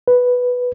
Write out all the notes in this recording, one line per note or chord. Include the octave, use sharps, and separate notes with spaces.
B4